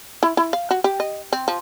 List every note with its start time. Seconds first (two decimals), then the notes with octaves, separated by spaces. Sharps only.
0.23 E4
0.37 E4
0.53 F5
0.71 F#4
0.84 G4
1.00 D#5
1.33 C4
1.48 F3